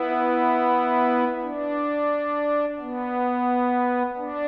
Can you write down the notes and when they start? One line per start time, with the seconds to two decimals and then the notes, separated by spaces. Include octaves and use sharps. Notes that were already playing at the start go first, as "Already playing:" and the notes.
Already playing: B3 E4
1.42 D4
2.79 B3
4.17 D4